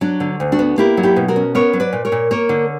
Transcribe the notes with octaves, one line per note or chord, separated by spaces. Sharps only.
F#3 D4
D3
D2
D4 F#4
B3
A#3 E4 G4
F#3
E4 G4
B2
F#4 A#4
C#4
B3 A#4 C#5
F#3
B4 D5
A#2
A#4 C#5
A#2
A#3 A#4 C#5
D3